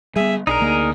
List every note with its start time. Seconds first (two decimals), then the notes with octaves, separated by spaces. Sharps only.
0.16 G3 B3 G#4 E5
0.47 B1 D4 D#4 G#4 A#4 A#5
0.60 D2 A#3